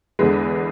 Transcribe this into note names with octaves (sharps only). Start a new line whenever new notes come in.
E2 D3 G#3 B4